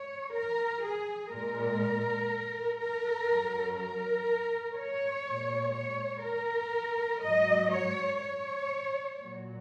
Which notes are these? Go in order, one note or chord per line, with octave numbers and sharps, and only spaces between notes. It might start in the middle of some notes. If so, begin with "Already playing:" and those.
Already playing: C#5
A#4
G#4
A#2 G#3 A#4
A#4
F#2 F#3
A#4
C#5
A#2 G#3
C#5
A#4
G#2 F#3 D#5
C#5
C#5
A#2 F#3